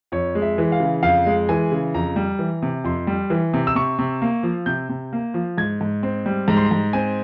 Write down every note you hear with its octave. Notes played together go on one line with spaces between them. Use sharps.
F2 C#5
G#3
E5
E3
F5
C#3
F2 F5
G#3
E3 G#5
C#3
F2 A#5
G3
E3
C3
F2 C6
G3
E3
C3
E6
C3 C#6
C3
A#3
F3
C3 G6
C3
A#3
F3
G#2 G#6
G#2
C4
G3
G#2 A#5
C6
A#5
G#2
C4 G#5